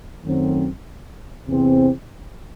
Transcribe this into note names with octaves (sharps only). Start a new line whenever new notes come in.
F#2 D#3 F#3 A3 C4
E2 C3 E3 C4